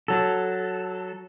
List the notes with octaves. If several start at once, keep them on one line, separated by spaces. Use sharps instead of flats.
F#3 A4